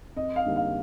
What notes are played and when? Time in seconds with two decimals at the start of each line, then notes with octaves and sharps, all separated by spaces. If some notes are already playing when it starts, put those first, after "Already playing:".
0.16 F2 D#5
0.36 F5
0.45 D3 G3 A#3 D#4
0.56 F5